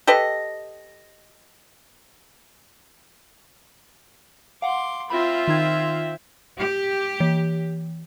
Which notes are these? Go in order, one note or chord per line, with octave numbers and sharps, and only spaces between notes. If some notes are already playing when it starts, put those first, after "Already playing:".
G4 A4 B4 D#5
F5 F#5 C6 D6
C4 F4 E5 B5
D#3 D#4 G#6
G4
E3